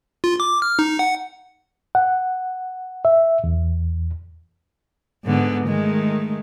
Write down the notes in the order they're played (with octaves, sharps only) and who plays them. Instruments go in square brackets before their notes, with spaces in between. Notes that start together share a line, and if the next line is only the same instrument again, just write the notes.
[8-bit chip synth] F4
D6
F6
D#4
F#5
[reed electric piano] F#5
E5
E2
[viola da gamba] G#2 D3 B3
D#3 G#3 A3